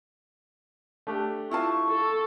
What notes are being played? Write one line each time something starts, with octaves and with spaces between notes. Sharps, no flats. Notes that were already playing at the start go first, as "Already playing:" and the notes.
A3 D4 G4
E4 F4 A5 C#6
A4